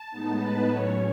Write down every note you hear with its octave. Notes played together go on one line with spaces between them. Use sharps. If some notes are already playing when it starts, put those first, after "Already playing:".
Already playing: A5
A2 G#3 B3 D#4
B4
A2 F#3 C#4 C#5